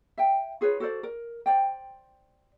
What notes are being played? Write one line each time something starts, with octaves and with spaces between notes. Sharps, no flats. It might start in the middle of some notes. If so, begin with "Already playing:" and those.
E5 G5
F4 G#4 B4 C#5
F#4 A4 C5 D5
A#4
C5 D5 G5